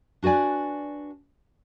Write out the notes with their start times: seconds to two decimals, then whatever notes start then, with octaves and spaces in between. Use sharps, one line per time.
0.23 D4 F#4 B4 D5 G#5